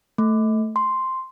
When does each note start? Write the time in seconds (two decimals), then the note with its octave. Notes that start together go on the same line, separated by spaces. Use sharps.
0.18 A3
0.76 C6